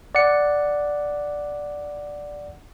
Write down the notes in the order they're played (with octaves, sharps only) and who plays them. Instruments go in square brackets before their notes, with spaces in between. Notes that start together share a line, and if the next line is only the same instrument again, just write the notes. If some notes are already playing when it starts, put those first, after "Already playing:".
[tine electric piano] D5 F#5 C#7